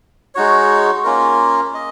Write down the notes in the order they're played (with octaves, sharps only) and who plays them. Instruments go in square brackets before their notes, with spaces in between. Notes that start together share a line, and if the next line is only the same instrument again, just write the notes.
[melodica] G#3 D#4 F#4 C#5
A#3 C#4 F4 A#4
D#5